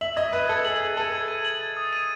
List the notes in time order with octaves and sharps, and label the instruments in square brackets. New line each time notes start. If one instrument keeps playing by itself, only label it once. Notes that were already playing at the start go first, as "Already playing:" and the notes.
[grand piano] E5 [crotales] F#7
[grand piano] D#5 [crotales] G#6
[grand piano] B4 [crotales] D#7
[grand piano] A4 [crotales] G#6
[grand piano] G#4 [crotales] F#7
[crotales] G#6
[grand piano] A4 [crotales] D#7
[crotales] G#6
D#7
F#7
A6
D#6
D#7